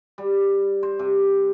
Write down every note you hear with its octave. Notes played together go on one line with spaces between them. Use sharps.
G3
C5
C3